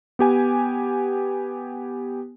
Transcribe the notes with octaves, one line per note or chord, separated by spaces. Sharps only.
B3 G4 G#5